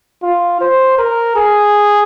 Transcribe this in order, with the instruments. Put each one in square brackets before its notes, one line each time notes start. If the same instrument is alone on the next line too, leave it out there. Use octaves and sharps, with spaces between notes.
[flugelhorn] F4
C5
A#4
G#4